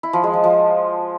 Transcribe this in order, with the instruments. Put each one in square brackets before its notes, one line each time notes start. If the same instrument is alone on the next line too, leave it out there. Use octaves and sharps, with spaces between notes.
[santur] E4
F3
G#3
F3
F3